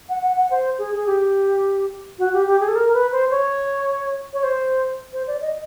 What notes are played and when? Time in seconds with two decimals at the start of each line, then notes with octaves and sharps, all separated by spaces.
0.09 F#5
0.22 F#5
0.37 F#5
0.51 C5
0.78 G#4
0.95 G#4
1.07 G4
2.19 F#4
2.33 G4
2.47 G4
2.60 G#4
2.68 A4
2.76 A#4
2.94 B4
3.12 C5
3.31 C#5
4.33 C#5
4.43 C5
5.13 C5
5.27 D5
5.41 D#5